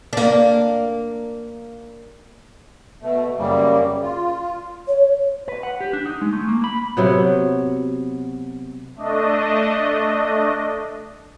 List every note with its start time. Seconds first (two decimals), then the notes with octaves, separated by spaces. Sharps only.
0.13 A#3 D4
3.02 B2 A3
3.38 F#2 C#3 G3 A#3
4.02 F4
4.88 C#5
5.48 B4
5.63 F#5
5.81 G4
5.93 D4
6.06 D#4
6.21 G#3
6.33 A3
6.48 A#3
6.64 B5
6.97 C3 F#3 B3
8.96 A3 D4 D#5